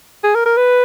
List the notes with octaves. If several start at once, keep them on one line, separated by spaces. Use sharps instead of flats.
G#4
A#4
A#4
B4